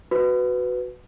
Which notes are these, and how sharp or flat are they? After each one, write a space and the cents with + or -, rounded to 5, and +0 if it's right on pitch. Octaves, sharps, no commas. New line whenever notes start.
F#4 +0 B4 +10